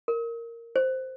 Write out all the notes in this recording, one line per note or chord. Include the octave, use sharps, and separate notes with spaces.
A#4
C5